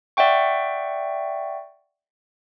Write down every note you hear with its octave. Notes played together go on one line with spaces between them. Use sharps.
D5 E5 F#5 G5 C#6